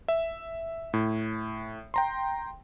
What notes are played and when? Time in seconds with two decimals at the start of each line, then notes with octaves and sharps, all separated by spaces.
0.08 E5
0.94 A2
1.94 G5 A#5 C6